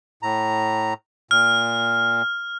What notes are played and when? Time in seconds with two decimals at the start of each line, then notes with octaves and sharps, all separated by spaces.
0.23 A2 A#5
1.31 A#2 F6